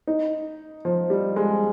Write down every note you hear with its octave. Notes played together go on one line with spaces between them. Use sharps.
D#4
F3
G3
G#3